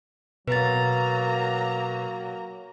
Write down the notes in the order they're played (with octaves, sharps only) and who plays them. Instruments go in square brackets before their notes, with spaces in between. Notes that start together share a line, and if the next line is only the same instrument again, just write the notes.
[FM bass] B2 [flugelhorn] F#3 [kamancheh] A#3 A#5 [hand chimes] B4 A6